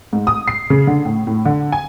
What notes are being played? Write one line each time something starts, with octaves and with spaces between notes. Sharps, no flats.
G#2
D#6
C7
C#3
D3
A2
A2
D3
G#5